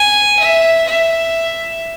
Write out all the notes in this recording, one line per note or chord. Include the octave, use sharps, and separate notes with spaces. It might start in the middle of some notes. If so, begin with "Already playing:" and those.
Already playing: G#5
E5
E5